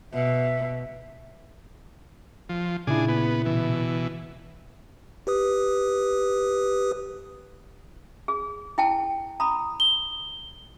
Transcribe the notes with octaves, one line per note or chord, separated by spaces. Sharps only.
B2 E5
F3
A#2 C#3 D4 E4 G#4
B3
B2 E3
G4 B4 D#6
G#4
E4 G5 A5
A#5 B5 D#6
G7